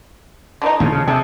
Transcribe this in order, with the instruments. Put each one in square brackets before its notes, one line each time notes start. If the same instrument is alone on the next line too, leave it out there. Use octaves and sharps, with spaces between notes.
[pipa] D3 E3 D#4
[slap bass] D#2 A2 C#3 [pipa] F3
[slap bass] C#3
[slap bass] C3 [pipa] G#4 A4